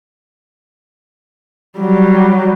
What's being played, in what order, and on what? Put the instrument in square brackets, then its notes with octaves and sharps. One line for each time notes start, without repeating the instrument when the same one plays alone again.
[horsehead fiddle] F#3 G3